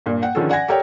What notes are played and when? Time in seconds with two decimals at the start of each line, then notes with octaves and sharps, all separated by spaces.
0.06 G2 A#2
0.22 F#5 G5
0.35 D3 D#3 F3 C#4 G#4 A4
0.50 D5 F#5 G#5 G#6 A#6
0.68 G4 A4 A#4 C#5 D5 G5